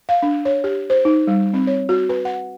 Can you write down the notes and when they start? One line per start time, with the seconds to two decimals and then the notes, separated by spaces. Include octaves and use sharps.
0.09 F5
0.23 D4
0.45 C#5
0.64 G4
0.90 C5
1.05 D#4
1.27 G3
1.53 C4
1.67 C#5
1.89 F#4
2.09 B4
2.25 F#5